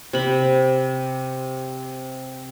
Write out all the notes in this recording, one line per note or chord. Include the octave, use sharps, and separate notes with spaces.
C3 B5